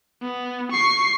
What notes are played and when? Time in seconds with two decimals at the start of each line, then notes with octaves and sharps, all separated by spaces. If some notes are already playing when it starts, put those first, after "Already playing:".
0.22 B3
0.71 C#6 C7